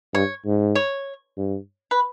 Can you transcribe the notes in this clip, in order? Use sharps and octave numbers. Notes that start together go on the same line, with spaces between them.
G2 C#5
G#2
C#5
G2
B4